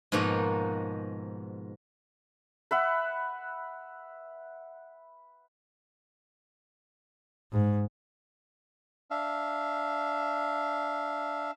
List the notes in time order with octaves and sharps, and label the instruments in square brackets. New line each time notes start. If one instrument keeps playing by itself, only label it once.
[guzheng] G#2 B2 F3 A#3 D#4 F#4
[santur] B4 E5 F#5
[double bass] G#2
[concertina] D4 E5 F5